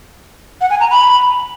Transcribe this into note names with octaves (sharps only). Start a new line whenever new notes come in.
F#5
G#5
A#5
B5